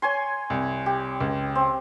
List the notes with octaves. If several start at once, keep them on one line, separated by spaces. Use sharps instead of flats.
C#5 G#5 C6
C2
G4
C#2
C4